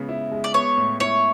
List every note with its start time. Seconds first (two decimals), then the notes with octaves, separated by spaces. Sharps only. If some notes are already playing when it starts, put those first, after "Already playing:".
Already playing: C#3 G#3 B3
0.09 E4
0.32 G#3
0.44 D5
0.54 B3 C#5
0.77 A2
1.00 E4 C#5